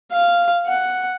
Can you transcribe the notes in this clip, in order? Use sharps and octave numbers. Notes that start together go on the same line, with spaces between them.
F5
F#5